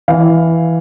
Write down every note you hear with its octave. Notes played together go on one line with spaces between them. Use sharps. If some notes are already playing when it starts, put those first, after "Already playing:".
E3 F5